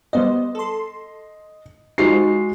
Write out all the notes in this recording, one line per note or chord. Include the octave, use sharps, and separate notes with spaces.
G3 B3 C5 D#5
A4 C6
G#3 D#4 F4 F#4 C5 C7